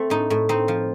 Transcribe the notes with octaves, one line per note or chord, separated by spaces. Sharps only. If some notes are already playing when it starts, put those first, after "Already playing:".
Already playing: A3 C4
A2 D#4
A2
C4 D#4
F3